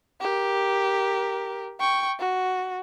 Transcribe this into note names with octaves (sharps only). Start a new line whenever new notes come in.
G4 A#4
G5 C#6
F#4